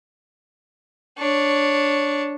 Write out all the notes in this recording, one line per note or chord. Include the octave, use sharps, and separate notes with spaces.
D4 C#5